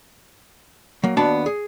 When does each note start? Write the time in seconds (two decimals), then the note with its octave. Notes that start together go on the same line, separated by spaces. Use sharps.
1.04 F#3 A#3
1.17 D#2 B3 D4 F#4 D5 A5
1.46 G#4